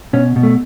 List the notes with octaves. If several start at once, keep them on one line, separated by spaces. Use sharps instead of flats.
B2 C#4
B2
A3